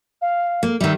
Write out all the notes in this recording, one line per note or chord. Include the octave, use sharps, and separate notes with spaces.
F5
A#3
D#3 G3 E5